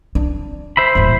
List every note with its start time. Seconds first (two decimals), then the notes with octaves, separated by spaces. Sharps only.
0.15 D4
0.77 C5 E5 B5
0.95 D#1 A1